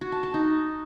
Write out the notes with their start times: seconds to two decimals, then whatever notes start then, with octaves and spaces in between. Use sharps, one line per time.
0.01 F#4
0.12 A5
0.23 A5
0.34 D#4